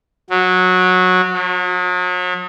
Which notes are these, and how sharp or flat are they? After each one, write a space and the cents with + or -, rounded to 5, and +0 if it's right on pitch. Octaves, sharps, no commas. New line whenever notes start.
F#3 -15
F#3 -40